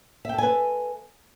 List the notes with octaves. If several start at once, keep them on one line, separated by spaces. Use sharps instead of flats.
A4 B4 E5 G5 G#5